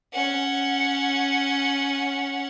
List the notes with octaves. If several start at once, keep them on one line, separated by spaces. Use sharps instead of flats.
C#4 F#5